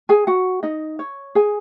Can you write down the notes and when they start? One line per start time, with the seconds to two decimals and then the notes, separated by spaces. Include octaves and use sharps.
0.09 G#4 G#5
0.27 F#4 F#5
0.63 D#4 D#5
0.99 C#5
1.35 G#4 G#5